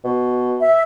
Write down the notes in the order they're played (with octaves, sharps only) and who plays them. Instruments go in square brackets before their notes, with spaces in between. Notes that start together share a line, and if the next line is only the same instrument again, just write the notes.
[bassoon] B2
[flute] E5